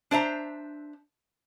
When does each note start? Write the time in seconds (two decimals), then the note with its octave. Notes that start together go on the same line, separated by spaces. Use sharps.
0.11 D4 C5 E5 A#5